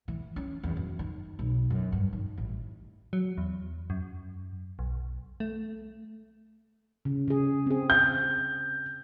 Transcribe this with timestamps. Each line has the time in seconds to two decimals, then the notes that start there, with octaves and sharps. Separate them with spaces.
0.08 E3
0.36 C#4
0.63 E2
0.77 F#2
0.99 D#3
1.39 B1
1.70 F#2
1.92 G2
2.13 D#3
2.38 A1
3.13 F#3
3.38 E2
3.90 F#2
4.79 B1
5.40 A3
7.05 C#3
7.28 C#3 G#4
7.66 C4 G#4
7.90 G6